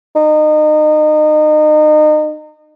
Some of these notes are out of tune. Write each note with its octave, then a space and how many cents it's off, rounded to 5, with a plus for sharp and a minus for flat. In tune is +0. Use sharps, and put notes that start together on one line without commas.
D#4 -30